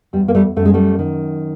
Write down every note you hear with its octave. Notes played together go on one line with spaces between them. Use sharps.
E2 G3
A#3
G3 A3
F#2 A3
G#3
G3 A3
D#3